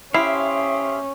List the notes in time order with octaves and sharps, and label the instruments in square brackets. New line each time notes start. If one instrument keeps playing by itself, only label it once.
[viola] C#4 [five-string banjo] E4 [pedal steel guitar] G4 C5 F5 [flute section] E5 C6 D#6